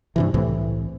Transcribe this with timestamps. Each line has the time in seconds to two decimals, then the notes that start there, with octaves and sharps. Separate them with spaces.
0.16 G2 C3 E3
0.34 C2 A2 C3 E3